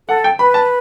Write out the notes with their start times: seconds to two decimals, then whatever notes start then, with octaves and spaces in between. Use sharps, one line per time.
0.08 A4 F#5
0.24 G5
0.39 B4 B5
0.54 A5